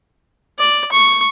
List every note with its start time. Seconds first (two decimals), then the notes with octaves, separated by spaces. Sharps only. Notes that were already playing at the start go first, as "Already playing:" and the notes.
0.58 D5
0.91 C#6